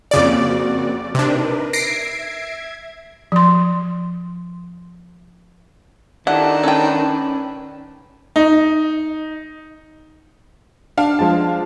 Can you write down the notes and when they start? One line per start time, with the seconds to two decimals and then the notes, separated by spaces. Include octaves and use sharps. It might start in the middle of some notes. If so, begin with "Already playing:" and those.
0.11 F2 C#3 A#3 C4 F#4 D5
1.15 C3 D4 D#4 A#4 B4
1.73 E5 G#6 A#6 C7 D7
3.32 F3 C6
6.27 D#3 D4 E4 G4 A4 F#5
6.63 C#4 A4 B4 G5
8.36 D#4
10.97 D4 F5
11.19 F3 G#3 A5